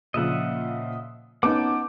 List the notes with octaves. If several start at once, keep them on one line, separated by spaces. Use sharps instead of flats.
A#2 C#3 F3 D#5 E5 F#5
B3 C#4 D#4 F#5 A5 D6 G6